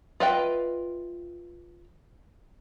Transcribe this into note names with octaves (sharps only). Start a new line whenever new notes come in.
F4 B4 D#5 E5 G5